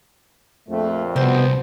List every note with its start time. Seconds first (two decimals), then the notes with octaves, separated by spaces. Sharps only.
0.68 A#1 F2 A3
1.16 C2 B2 B3 C5